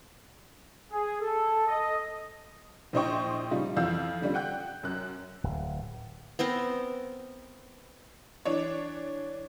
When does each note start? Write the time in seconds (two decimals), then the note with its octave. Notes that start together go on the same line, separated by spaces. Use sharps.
0.92 G#4
1.21 A4
1.68 D#5
2.93 A#1 E4 C5 D#5 G5 C#6
3.51 C#3 F3 G3 D#4 F4
3.76 F2 E3 F5 E6 G6
4.22 D3 G3 C#4 F4
4.34 F#5 G5 F#6 G6
4.83 F#2 F#6
5.44 D1
6.39 B3 C4 A#4 C5
8.45 E3 D4 C#5